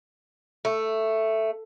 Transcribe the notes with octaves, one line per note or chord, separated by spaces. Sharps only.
A3